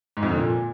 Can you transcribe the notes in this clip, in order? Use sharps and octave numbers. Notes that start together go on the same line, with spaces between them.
G#2
F2
D3
A#2